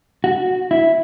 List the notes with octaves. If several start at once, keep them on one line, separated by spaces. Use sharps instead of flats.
F#4
E4